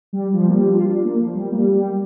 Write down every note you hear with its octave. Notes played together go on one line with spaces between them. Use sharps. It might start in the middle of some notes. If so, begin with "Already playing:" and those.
G3
F3
A#3
G3
D4
F4
D4
A#3
F3
G3
A#3
G3
G3